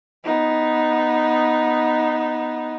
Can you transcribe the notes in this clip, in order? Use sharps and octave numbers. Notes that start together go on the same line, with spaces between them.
B3 D#4